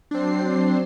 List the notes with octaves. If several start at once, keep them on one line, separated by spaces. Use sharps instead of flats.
F#3 C4 D4 C5 C7